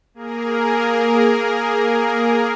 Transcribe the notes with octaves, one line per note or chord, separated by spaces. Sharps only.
A#3 G#4 A#4